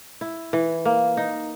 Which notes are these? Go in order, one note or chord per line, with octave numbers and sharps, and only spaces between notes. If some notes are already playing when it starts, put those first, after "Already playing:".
E4
E3
A#3
D#4